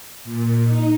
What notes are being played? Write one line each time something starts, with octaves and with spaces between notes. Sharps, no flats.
A#2
D#4